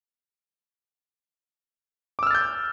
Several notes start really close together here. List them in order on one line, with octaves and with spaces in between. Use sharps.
D6 E6 F6 A6 G6